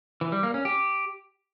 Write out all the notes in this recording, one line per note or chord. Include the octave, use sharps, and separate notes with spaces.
E3
G3
A#3
C#4
G4